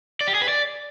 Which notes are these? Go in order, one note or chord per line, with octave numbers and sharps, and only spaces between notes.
D5
G4
G#4
B4
D5